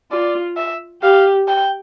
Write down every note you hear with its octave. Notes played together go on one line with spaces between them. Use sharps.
F4 D5
E5
G4 F5
G5